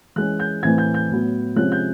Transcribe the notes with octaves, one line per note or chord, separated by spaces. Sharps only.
E3 G#3 C#4 F#6
G6
A2 E3 A3 C4 G#6
G6
G6
A2 F#3 B3
C3 F3 G#3 C#4 F#6
G6